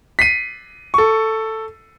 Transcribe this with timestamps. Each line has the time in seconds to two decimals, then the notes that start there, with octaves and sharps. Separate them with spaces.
0.19 B6 C7 D#7
0.94 A4 C#6